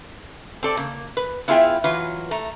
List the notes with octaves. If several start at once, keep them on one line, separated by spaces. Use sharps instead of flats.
C4 A4 D5
C#3 A#3
B4
B3 E4 F4 G#4 E5 G5
E3 F#3 F4 B4
A3 A#5